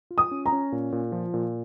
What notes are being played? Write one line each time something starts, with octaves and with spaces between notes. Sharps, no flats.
F4
D#6
C#4
A#5
C#4
A#2
A#2
F3
A#2